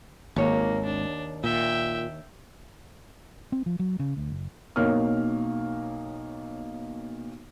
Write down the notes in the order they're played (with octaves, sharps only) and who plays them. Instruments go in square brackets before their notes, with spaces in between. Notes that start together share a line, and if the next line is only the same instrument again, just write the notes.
[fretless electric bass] G#1 [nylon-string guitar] D#2 C#5 [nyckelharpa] A#3
[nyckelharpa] D4
[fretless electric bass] A#2 [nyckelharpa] E5 G5
[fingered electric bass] C4
F3
F#3
C#3
D2
F#1
[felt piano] B1 A#3 D#4 C#5 F6